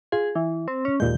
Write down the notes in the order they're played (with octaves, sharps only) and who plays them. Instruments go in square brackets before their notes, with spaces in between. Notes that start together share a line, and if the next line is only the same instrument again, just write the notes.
[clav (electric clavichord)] F4 [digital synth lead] G#4
[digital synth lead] E3
C4
C#4
[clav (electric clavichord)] D#2 A#2 G#3 [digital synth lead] G6